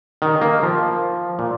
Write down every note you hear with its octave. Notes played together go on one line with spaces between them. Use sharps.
D#3
A#3
F3
A#2